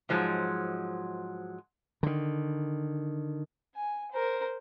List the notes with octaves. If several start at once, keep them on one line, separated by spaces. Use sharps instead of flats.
G#2 F3 F#3 G#3
D3 D#3
G#5
A#4 C5